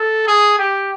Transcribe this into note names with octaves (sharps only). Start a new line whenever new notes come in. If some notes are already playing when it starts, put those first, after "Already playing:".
Already playing: A4
G#4
G4